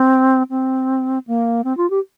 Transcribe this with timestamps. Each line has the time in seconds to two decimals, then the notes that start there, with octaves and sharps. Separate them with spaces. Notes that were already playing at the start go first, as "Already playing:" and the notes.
Already playing: C4
0.50 C4
1.27 A#3
1.64 C4
1.77 F4
1.90 G4